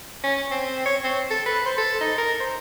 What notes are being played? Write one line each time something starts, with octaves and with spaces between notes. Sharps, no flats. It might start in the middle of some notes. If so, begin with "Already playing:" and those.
C#4
C4
C#5
C4
A4
B4
C5
A4
D#4
A#4
C5